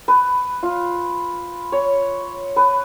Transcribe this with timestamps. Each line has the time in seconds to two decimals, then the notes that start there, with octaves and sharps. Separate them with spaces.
0.08 B4
0.63 F4
1.72 C#5
2.56 B4